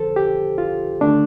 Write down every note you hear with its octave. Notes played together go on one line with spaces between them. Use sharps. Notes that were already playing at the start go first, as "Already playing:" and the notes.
Already playing: F2 D3 F3 A4 C5
G4
F4
D#2 D3 A3 D4